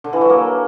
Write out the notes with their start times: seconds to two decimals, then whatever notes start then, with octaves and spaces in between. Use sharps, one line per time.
0.04 D3
0.13 E3
0.21 F#3
0.30 A#3